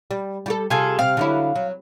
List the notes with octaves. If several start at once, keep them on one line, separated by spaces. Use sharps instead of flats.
G3
G3 F#4 A4
C3 F4 G#4 A4
C3 C4 F5 F6
D3 F#3 E4
F#3